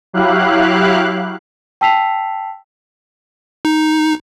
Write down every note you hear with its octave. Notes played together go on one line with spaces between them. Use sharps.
F#3 E4 G4 F5 F#6
G5 A5 E6 B6 C7 F7
D#4